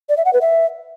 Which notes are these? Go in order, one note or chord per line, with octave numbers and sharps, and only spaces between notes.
D5
E5
F#5
B4
E5